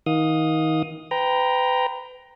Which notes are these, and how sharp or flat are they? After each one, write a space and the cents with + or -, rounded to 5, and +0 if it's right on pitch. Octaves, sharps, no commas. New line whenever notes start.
D#3 +30 F5 +30 D#6 +0
B4 +35 G5 +0 A#5 +10